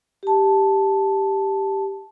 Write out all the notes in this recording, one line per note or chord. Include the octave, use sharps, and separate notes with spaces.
G4 A5